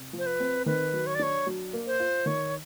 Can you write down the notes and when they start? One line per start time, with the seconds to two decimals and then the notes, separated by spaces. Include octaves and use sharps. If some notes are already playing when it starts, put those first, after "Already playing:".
Already playing: C3
0.13 F3
0.18 C5
0.26 B4
0.40 C4
0.66 D#3 B4
0.93 F#3
1.07 C#5
1.15 D5
1.19 D4 C#5
1.47 F#3
1.73 A#3
1.87 C5
2.00 F4
2.26 D#3 C#5